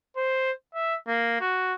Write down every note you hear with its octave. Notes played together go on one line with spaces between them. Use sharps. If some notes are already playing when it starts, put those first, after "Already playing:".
C5
E5
A#3
F#4